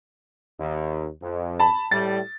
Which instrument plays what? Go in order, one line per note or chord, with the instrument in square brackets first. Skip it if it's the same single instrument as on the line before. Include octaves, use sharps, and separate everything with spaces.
[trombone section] D#2
F2
[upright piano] A5 B5
[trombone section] A2 G3 [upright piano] A6